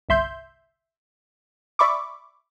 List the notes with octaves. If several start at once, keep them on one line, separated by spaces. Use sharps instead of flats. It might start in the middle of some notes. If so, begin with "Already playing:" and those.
G1 C2 E5 C6 G6
D5 E5 B5 C#6 D6